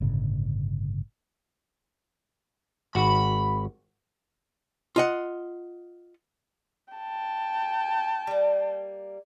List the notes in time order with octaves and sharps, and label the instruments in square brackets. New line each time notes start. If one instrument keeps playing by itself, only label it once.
[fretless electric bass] G1 A2 C#3 A3
[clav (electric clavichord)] G#1 F#4 [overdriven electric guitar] B5
[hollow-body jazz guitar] F4 D#5 F#5
[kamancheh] G5 A5
[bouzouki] G3 A#3